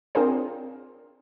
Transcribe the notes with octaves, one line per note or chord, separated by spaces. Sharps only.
C4 D4 F4 G#4 A#4 C5